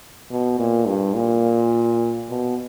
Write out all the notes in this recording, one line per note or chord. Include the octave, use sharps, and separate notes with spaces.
B2
A#2
G2
A#2
B2